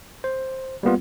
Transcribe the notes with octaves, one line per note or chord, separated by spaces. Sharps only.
C5
G3 A#3 B3 F4